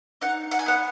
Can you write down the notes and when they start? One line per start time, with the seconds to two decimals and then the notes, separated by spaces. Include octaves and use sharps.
0.21 D#4 F#5
0.51 F#5
0.59 G#5
0.66 B3 F#5